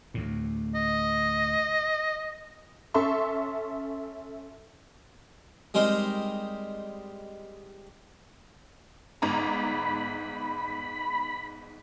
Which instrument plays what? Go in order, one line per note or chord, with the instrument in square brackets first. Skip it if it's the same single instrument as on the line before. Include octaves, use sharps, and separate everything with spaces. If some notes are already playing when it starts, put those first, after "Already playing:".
[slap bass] D2 A2
[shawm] D#5
[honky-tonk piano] C#4 A4 E5 C6 C#6
[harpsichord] G3 G#3 C4 D#4 A#4 C5
[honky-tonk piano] G1 G#2 A#5 [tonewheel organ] B5